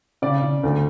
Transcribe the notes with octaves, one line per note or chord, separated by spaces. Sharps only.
C#3 D5
C#3
D2